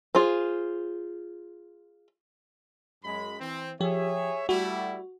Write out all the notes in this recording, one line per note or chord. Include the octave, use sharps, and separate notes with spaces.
F4 G#4 C5
F#2 G#3 B5
E3 C4
F3 G4 G#4 C#5 E5
G3 A3 E4 F#4